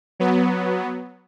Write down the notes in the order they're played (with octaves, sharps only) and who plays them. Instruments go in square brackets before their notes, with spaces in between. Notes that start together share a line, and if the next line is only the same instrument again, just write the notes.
[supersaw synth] F#3 B3